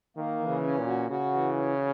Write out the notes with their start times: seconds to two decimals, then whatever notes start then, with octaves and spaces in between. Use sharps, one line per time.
0.16 D#3 A#3
0.40 E3
0.47 C#3
0.64 C#4
0.78 A#2
0.87 F#4
1.10 C#3 F#4
1.34 E3
1.57 C#4